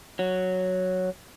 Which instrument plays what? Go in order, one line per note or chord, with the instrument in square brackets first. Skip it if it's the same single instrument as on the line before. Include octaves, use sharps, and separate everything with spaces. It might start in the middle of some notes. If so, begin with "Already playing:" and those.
[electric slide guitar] F#3